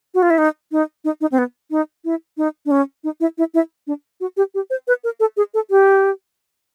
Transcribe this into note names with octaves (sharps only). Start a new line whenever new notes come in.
F#4
F4
E4
D#4
D#4
D#4
D#4
C4
B3
D#4
E4
D#4
D4
C#4
D#4
E4
E4
E4
D4
F#4
G4
G4
C5
B4
A#4
A4
G#4
A4
G4